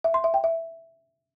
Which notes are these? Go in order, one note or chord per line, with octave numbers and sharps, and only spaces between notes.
E5
C6
E5
G5
E5